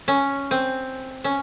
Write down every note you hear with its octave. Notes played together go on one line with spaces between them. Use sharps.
C#4
C4
C#4